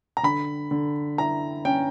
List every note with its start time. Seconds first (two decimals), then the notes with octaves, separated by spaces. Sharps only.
0.17 A#5
0.23 D3 B5
0.71 D3
1.18 E4 A#5
1.65 C#4 G5